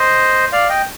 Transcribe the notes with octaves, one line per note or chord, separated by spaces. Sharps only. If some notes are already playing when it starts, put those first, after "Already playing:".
Already playing: C5 D#5
D5 F5
D#5 G5